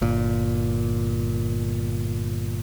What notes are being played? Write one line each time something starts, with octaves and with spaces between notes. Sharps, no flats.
G1 A#2